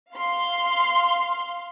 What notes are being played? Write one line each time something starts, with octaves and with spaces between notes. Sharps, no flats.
F5 C6